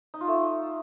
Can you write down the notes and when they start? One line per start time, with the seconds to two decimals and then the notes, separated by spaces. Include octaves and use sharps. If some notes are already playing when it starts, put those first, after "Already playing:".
0.14 D#4
0.21 F4
0.27 A3